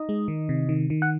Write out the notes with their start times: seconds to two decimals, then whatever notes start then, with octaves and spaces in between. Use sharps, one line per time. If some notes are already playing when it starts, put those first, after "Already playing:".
Already playing: D#4 D#5
0.09 G#3
0.28 D#3
0.49 C3
0.69 D#3
0.90 D#3
1.02 F#5